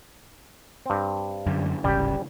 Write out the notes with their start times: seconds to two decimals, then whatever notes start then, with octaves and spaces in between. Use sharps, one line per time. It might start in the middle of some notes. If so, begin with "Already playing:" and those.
0.86 G2 C4
1.46 F#2 D3
1.84 D1 G#1 C#3 G3 G4